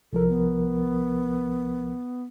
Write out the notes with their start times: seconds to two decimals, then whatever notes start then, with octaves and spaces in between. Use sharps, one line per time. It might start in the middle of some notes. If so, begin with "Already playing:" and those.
0.13 C2 F3 A4 A#4
0.28 B3